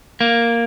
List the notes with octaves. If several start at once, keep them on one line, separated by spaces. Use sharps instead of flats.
A#3